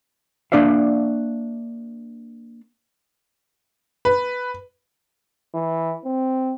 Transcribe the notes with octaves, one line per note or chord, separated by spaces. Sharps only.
A#3 D4 D5 E5 F5
B4
E3
C4